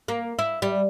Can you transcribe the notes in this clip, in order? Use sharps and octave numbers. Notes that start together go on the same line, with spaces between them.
A#3
E4
G3